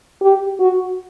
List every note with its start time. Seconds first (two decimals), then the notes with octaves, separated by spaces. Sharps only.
0.21 G4
0.59 F#4